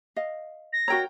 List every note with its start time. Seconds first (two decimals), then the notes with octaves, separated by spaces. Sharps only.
0.16 D#5 F5
0.73 A#6
0.88 F#4 A#4 C#5 G5 A#5